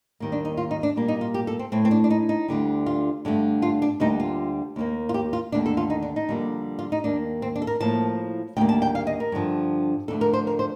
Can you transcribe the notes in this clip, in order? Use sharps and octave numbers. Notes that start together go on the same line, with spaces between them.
D#2 D#3 G3 A#3
D4
D#4
F4
D#4
D4
A#2 G3 A#3
D#4
F4
G4
A4
C4
A2 A3 C4
C4
D4
D4
D#4
D#4
D2 D3 G3
F4
G2 D3 A3
F4
D4
D2 D3 G3 A#3 D#4
F4
D#2 D#3 G3 A#3
F4
G4
F4
D#2 D3 A3 D4
A4
F4
D#4
D4
D#4
F2 D3 G3 A#3
F4
D#4
D#2 D#3 A#3 D4
C4
D4
A4
A#4
A2 F3 A#3 A5
D2 C3 D#3 G3 A#3 G5
A5
G5
F5
D#5
A#4
G2 D3 F3
F2 D3 A3 A4
A#4
C5
A#4
C5